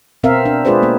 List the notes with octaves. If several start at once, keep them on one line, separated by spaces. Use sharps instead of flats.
B2 B3 C4 A#4 E5 F5
D4
G#3 F4 G#4 B4 C5 D5
A#3 B3